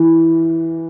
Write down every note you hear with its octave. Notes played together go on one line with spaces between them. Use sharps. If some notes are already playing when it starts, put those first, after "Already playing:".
Already playing: E3